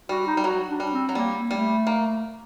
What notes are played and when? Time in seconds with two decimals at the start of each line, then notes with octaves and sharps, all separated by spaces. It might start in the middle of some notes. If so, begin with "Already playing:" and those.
0.09 G3 F#4
0.27 D#4
0.37 G3
0.44 F#3 F#4
0.68 D4
0.80 G3
0.91 C4
1.09 F#3
1.15 G3 A#3
1.51 G3 A3
1.87 A#3